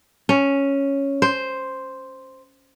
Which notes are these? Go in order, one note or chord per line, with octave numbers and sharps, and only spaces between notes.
C#4
C5